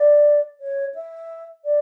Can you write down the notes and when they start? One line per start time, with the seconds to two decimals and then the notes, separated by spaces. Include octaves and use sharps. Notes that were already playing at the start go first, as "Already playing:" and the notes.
Already playing: D5
0.61 C#5
0.94 E5
1.65 D5